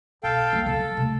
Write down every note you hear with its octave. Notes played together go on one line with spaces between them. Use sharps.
B1 A4 F5 G5
F#3 A#3
C#3 D4 A4
C3 A3